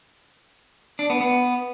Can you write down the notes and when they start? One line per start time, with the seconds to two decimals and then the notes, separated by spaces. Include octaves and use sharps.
0.99 D4
1.10 B3
1.21 B3